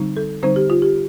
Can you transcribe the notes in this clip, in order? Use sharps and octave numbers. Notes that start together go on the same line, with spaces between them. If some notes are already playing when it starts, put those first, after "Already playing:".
Already playing: D3 G3 C4 D#4
A4
D3 G3 C4 D#4 C5
G4
F4
G4